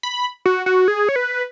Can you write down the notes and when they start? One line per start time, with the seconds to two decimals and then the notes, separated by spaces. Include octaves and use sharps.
0.03 B5
0.46 F#4
0.66 F#4
0.88 G#4
1.09 C#5
1.16 B4